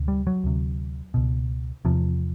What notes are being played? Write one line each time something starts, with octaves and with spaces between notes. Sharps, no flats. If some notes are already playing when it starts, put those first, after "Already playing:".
Already playing: D2 C3
G3
F#3
D2 C3
C#2 B2
E2 C3 F3